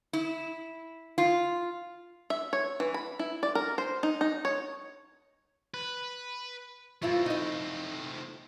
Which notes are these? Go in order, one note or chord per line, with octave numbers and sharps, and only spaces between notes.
E4
F4
E5
C#5
E3
B5
E4
D5
A#4
C5
D#4
D#4
C#5
B4
G2 A3 C4 E4 F4
D#4 D#5